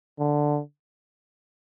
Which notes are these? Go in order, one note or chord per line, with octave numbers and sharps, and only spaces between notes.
D3